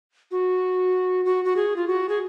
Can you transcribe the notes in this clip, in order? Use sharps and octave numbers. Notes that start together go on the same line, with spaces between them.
F#4
F#4
F#4
G#4
F4
F#4
G#4